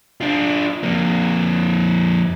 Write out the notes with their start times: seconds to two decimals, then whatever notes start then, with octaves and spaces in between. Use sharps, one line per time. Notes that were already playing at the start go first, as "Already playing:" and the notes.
0.21 D4 F4
0.83 F2 A#3